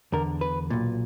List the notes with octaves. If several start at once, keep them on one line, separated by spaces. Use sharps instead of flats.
E2 D3 A#4
B4
B1 A#2